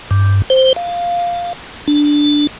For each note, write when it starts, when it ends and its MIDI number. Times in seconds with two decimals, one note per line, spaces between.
0.11 0.42 43
0.50 0.73 72
0.76 1.53 77
1.88 2.47 62